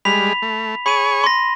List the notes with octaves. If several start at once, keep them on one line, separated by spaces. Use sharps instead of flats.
G3 G#3 B5 B6 F7
A3
G#4 C#5 B5 C#6 D#7
C6 A#6